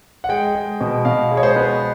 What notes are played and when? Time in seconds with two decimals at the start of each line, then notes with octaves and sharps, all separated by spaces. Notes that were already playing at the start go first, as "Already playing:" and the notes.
0.24 F#5
0.29 G#3 G5
0.55 G#3
0.81 B2
1.05 B2 F5
1.31 G#3
1.37 C#5
1.43 C5
1.56 B3